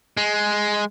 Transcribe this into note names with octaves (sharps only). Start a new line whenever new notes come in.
G#3